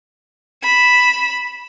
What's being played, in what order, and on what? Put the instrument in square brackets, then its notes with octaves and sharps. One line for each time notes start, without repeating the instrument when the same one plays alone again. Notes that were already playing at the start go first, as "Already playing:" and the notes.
[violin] B5 E7